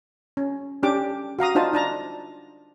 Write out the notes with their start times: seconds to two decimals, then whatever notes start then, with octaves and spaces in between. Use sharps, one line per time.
0.37 C#4
0.83 C#4 D4 G4 D6
1.39 F#4 F5 A#5 D#6
1.55 D4 D#4 F4 C5 A5
1.73 D4 A5 A#5